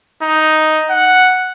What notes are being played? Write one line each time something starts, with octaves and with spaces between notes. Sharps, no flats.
D#4
F#5